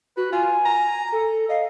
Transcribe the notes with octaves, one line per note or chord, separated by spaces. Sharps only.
F#4 B4
F4 G#5
A#5
A4
D#5 F5